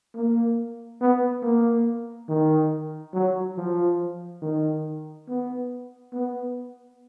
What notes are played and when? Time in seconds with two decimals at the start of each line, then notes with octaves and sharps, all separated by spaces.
0.15 A#3
1.01 B3
1.43 A#3
2.29 D#3
3.14 F#3
3.57 F3
4.42 D#3
5.28 B3
6.13 B3